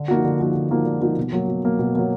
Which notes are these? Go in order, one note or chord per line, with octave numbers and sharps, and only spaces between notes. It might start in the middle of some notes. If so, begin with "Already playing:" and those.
Already playing: D3
F3 A#3 D#4 F#4
D3
F3 A#3 D#4 F#4
D3
F3 A#3 D#4 F#4
D3
F3 A#3 D#4 F#4
B2
F#3 A#3
B2
F#3 A#3
B2
F#3 A#3